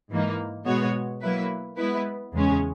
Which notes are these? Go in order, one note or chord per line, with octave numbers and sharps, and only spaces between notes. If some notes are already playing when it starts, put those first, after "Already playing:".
G#2 E3 A#3 D#4
B2 G#3 B3 F#4 C#5
F#3 A#3 E4 B4
G#3 B3 E4 B4
E2 C#3 G#3 C#4